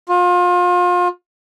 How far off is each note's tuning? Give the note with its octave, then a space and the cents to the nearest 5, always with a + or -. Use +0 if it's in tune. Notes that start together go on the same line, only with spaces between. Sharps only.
F4 +30